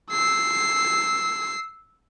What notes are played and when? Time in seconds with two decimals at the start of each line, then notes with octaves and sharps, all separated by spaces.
0.11 E6 C7